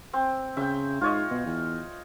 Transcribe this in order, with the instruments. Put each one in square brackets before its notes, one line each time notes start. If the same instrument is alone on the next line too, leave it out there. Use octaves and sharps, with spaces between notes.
[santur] C4
[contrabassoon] C#3 [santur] E5 G5
[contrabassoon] G#2 [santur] F4 C#5 D#5
[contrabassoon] B2
E2